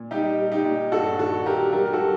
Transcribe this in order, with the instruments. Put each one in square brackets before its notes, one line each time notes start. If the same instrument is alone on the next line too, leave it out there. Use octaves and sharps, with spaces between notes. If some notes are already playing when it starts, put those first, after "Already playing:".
Already playing: [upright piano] A#2
G3 D#4 G4
G3
D#4 G4
A#2
G2 F#4 A4
D#3 F#4 A4
G2 G4 A#4
F#3 G4 A#4
G4
F#4 A4
F#3